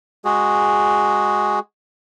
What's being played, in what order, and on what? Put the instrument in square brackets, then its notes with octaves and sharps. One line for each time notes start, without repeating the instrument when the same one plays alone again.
[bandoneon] G#3 F#4 G#4